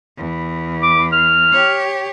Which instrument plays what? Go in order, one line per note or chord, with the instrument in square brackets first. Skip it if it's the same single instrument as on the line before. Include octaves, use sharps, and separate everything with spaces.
[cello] E2
[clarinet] D6
F6
[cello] G4 C#5